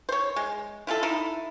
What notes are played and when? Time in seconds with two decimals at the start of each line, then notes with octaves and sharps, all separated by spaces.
0.09 C5 C#5
0.36 G#3
0.87 E4 F4 G#4 A4
1.03 D#4 E4